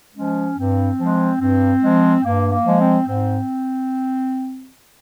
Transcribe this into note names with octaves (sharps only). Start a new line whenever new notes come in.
F3 G#3 C#4
G2 C4
F3 G#3
G2 C4
F3 G#3
G2 A#3
A#3
F3 G#3
C4
G#2 C4